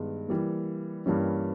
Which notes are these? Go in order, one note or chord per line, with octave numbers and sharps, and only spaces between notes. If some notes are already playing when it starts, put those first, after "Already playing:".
Already playing: G2 D#3 G#3 B3
E3 G3 A#3
G2 E3 G3 A#3 C#4